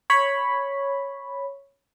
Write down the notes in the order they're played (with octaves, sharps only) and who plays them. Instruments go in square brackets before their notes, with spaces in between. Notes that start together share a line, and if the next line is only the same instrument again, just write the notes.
[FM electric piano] C#5 B5